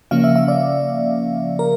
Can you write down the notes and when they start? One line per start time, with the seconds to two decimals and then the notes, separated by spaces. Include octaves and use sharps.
0.11 C#3 F3 A#3 C#4 F5
0.24 E5
0.36 E5
0.48 D5
1.59 A#4